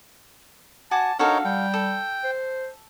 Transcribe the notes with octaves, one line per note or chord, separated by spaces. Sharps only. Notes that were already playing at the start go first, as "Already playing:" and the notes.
F#4 G#5 A5 D6
D4 D#4 F#4 A4 A#4 C#5 F5
G3 G5
A4
C5